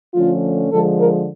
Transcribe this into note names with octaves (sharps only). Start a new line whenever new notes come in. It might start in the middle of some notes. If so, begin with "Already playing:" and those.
D3 F3 A3 C#4 F4
D3 F3 G#3 A4
A#4